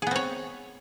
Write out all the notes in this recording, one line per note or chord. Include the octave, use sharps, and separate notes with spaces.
B3 C4 G#4 C#5